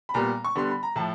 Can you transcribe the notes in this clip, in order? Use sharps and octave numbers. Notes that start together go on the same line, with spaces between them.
B5
A#2 G3 B3 A#5
C#6
D3 G3 B3 C6
B5
A#5
A2 F3 A5